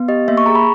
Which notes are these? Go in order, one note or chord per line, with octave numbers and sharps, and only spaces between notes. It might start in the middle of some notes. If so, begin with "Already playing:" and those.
Already playing: B3
G4 D#5
A#3 E5
C#6
G#4 A#5
B5